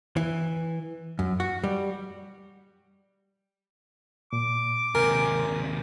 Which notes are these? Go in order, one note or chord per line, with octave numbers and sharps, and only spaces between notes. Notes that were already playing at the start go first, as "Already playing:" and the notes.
E3
F#2
F#4
G3
A#2 D6
D#2 C3 A#4 G#5